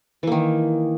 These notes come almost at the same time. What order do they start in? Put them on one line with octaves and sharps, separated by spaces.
E3 A#3 D#3